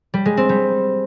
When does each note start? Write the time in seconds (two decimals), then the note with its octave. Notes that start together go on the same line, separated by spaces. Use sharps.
0.14 G3
0.26 G#3
0.37 C4
0.49 G3